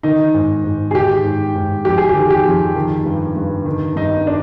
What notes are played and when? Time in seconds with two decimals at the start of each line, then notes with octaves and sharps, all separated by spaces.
0.03 D#3 D#4
0.34 G#2
0.64 G#2
0.91 G#4
0.95 D#3 G4
1.24 G#2
1.55 G#2
1.85 F2 G4
1.98 G#4
2.09 G4
2.15 D#3
2.30 G4
2.45 F2
2.75 D#3
3.05 G2
3.37 G2
3.65 D#3
3.96 G2 D#4
4.27 D4